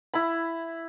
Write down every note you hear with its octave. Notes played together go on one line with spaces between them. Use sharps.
E4 B5